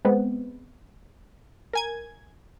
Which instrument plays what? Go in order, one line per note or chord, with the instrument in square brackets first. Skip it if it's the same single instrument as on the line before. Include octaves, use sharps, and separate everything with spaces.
[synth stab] G#3 B3 C4
A#4 G#5 G#6